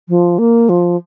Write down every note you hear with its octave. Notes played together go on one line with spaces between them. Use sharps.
F3
A#3
F3